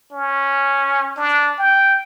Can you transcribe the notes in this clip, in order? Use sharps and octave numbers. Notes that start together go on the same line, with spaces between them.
C#4
D4
G5